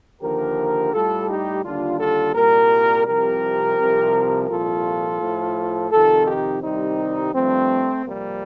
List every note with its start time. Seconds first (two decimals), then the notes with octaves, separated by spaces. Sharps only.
0.21 D#2 D3 F3 G4 A#4
0.93 A2 G3 F4 A4
1.29 D#4 G4
1.64 D#2 D3 G3 D4 F4
1.99 F4 A4
2.35 C2 A#2 G3 G4 A#4
3.06 C2 C3 F3 G4 A#4
3.78 C2 C3 F3
4.48 C2 A#2 F3 F4 A4
5.20 A2 F3
5.91 F2 C3 D#3 F4 A4
6.26 D#4 G4
6.62 C2 C3 D#3 G3 C4 D#4
7.34 G2 F3 A3 C4
8.04 F2 C3 G3 A#3